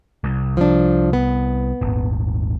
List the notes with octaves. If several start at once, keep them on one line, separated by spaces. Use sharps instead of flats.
C2
F3 D4
B3
D#1 G#1